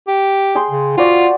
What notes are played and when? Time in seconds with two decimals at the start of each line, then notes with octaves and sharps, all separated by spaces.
0.08 G4
0.55 G#4 G5 C6
0.71 C#3
0.97 F4 F#4 C5 D5